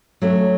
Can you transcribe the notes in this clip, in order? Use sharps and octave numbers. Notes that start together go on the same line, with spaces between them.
F#3 A3 C#4